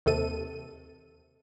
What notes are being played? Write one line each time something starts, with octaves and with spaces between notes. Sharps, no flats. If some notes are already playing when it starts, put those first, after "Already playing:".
D#2 C3 A4 D#7